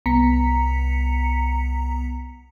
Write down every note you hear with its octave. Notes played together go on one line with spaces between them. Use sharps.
C2 B3 A#5 B6 C#7